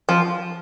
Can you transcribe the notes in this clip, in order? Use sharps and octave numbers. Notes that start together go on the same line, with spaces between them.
F3